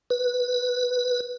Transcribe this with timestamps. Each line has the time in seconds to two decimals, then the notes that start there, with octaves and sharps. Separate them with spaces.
0.10 B4